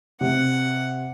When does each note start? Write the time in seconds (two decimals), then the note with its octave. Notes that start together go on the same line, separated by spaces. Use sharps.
0.21 C3 F#5